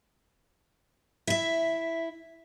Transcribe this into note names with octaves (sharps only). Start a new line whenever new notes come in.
E4 E5